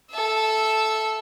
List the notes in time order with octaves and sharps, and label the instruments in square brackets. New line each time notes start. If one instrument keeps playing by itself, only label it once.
[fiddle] A4 E5